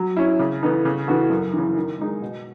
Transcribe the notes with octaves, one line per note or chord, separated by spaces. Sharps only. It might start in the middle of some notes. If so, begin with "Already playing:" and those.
Already playing: F#3
C#4 E4
C#3
E3 B3 D#4 A4
C#3
E3 B3 F#4 A4
F#2
C#3 E3
D#3
G#3 D#4 G#4
B2